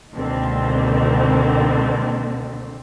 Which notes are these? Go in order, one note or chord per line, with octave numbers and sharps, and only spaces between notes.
C#2 B2 D3 D#3 A#3 C4